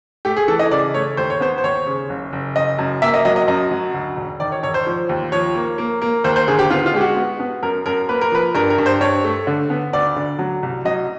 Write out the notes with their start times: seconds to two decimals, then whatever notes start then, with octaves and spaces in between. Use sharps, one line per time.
0.25 A3 G4
0.36 G#4
0.48 E3 A4
0.59 D#5
0.71 C#3 D5
0.94 A3 C#5
1.17 D#2 C5
1.30 C#5
1.41 B3 C5
1.58 C5
1.63 D#2 C#5
1.87 C#3
2.10 F#1
2.33 F#1
2.56 F#1 D#5
2.79 F#2
3.02 A#3 E5
3.14 D#5
3.25 F#3 D#5
3.36 D#5
3.48 F#2 D#5
3.71 F#3
3.94 D2
4.17 E1
4.40 D#3 D5
4.52 C#5
4.63 E1 C#5
4.74 C5
4.87 F3
5.09 D#2
5.32 F3 C#5
5.55 A#3
5.78 A#3
6.02 A#3
6.24 D#2 C5
6.36 C5
6.48 D3 G#4
6.59 G4
6.70 B3 F4
6.86 F4
6.93 G#3 G4
7.01 F#4
7.16 B3
7.40 B3
7.63 F#2 A#4
7.86 F#2 A#4
8.09 A#3 B4
8.21 A#4
8.32 F3 B4
8.55 G2 A#4
8.70 A#4
8.78 G2
8.86 C5
9.01 G2 C#5
9.24 A3
9.47 D3
9.70 B3
9.93 D2 D5
10.16 D3
10.39 F#3
10.63 C2
10.85 F#3 D#5